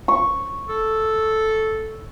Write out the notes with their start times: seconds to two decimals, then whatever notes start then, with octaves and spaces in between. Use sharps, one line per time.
0.08 C#6
0.69 A4